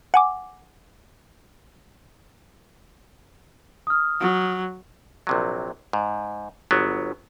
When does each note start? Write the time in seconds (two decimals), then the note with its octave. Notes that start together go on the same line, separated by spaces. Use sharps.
0.14 F#5 G#5 D6
3.87 D#6 F6
4.20 F#3
5.27 A#1 C3 F#3
5.93 G#2
6.71 G1 F#3 B3